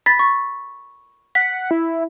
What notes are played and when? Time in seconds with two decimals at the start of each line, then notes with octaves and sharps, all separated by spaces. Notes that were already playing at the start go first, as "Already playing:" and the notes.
0.06 B5 A6 B6
0.19 C#6
1.35 F#5 B6
1.71 E4